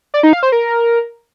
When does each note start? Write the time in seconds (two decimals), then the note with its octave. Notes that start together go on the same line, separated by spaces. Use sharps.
0.14 D5
0.23 D#4
0.33 F5
0.43 C5
0.52 A#4